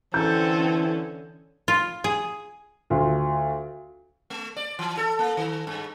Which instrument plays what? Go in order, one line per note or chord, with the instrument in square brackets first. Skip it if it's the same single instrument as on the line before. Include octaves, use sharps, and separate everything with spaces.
[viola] D3 C#4 [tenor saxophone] E3 [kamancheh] C4 A4 [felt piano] G6
[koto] F4
G#4
[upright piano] D2 F4
[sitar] A3
D5
E3
A4
A#3
D#3
G2